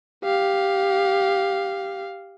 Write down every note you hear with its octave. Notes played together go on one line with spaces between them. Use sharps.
G4 F5